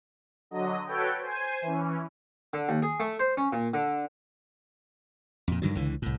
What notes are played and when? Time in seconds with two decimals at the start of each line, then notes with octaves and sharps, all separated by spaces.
0.51 D3 F#3 D#5
0.87 F#4 A4 B4 C#5 G5
1.19 C5 G#5
1.62 E3 C#4
2.53 D3
2.69 D#2
2.82 G#4
3.00 A3
3.19 C5
3.37 C#4
3.53 A#2
3.74 D3
5.48 F2 A#2
5.62 G2 D3 D#3 F#3
5.75 C#2 D3 E3
6.02 C2 A2